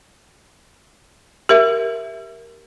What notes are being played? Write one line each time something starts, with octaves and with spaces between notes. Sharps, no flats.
G4 A#4 E5